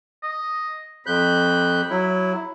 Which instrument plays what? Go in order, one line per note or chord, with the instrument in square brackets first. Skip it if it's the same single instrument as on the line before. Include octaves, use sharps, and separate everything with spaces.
[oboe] D#5
[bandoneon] F2 F#6 G6 [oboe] B5
[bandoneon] F#3 E4